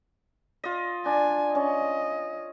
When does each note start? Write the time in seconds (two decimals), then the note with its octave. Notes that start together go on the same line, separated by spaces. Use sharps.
0.64 F4 D#5
1.06 D4 G#5
1.55 C#4 D#5